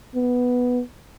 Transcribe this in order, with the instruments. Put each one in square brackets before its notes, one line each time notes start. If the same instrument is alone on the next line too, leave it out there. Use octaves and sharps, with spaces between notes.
[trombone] B3